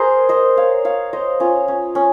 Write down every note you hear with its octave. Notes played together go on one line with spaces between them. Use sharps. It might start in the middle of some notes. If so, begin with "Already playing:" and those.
Already playing: G#4 A#4 C5
C5 D#5
C#5 F5
C#5 F5
C5 D#5
C#4 F4
C#4
C#4